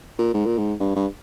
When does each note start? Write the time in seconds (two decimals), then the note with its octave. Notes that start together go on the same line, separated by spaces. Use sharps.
0.19 A#2
0.34 G#2
0.46 A#2
0.57 G#2
0.80 G2
0.96 G2